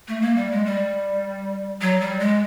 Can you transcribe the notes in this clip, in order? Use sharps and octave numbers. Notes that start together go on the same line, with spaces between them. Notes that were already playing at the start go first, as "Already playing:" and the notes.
A3
A#3
G3
G#3
G3
F#3
G3
G#3